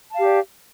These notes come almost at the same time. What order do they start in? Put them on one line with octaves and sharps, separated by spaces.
A5 F5 G4 D5